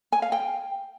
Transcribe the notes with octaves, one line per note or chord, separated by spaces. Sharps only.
G#5
F5
G5